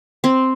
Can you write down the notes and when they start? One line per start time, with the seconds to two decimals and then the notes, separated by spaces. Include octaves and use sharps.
0.24 C4